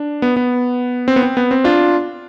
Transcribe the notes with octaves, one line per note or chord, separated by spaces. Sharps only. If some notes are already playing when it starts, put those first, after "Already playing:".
Already playing: D4
B3
B3
C4
B3
C4
B3
C4
D4 F4